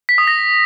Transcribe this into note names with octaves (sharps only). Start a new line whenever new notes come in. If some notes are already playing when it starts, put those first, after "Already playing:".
B6
D#6
A#6